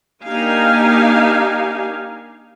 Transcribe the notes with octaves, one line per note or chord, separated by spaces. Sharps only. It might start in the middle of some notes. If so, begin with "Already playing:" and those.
A#3 D4 D#4 G4 F5 G#5